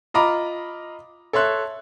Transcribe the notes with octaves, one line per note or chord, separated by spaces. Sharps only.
F4 D#5 A#5 B5 D6
A4 C#5 E5 C6 F#6